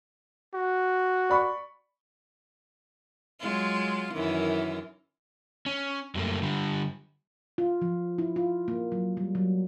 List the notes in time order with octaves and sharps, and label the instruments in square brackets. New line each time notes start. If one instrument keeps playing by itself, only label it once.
[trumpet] F#4
[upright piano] D5 B5 C#6
[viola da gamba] F#3 G#3 F4
F#2 D#3 E3
[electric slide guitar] C#4
F#2 F#3 G3 A3 A#3
D3 G3
[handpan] F4
F3
E4
F4
A#3
F#3
G3
F#3